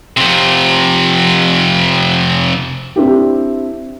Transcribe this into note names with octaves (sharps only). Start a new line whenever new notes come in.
F2 C3
C4 D4 E4 G4